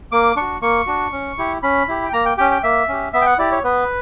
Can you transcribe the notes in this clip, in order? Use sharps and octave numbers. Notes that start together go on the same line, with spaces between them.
A#3 D6
D4 F#4 C#6
A#3 C#6
D4 F#4
C#4
E4 G4
C#4 B5
E4 G4
G5
A#3 A#5
G5
C#4 G4 G5
G5
A#3 E5
C#4 G4
B3 E5
G5
F#5
E4 G4 D5
C#5
B3 B4